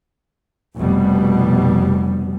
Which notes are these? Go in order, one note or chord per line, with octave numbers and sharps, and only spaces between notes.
F1 B2 G3